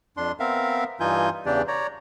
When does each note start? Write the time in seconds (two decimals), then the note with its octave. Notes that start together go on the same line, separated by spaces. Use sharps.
0.17 F2 D4 C6
0.40 B3 C4 A#4 E5 F5
1.00 G2 E3 D#4 F4 G#5 G6
1.46 E2 C#3 E3 D4 G4 D5
1.68 C#5 D5 A#5